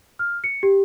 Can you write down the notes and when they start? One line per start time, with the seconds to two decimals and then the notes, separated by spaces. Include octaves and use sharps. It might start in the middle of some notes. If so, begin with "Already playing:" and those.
0.19 F6
0.44 C#7
0.63 G4